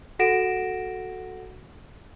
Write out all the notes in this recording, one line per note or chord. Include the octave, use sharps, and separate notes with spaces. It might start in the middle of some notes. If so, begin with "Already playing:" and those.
F#4 A4 F#5 A#6 D7 E7